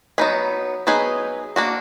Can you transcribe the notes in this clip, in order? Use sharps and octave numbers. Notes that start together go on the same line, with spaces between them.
F#3 B3 D#4 G#4 B4
F#3 B3 D#4 G#4 B4
A#3 D4 F#4